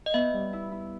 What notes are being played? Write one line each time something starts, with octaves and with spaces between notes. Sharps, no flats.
D#5
B3 E5
G3
E4
E4